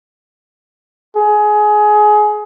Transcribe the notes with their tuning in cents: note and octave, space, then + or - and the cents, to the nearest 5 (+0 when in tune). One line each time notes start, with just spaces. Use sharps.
G#4 +20